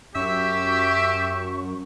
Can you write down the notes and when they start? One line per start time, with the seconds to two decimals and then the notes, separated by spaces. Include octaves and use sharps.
0.15 F#2 G4 E5 C#6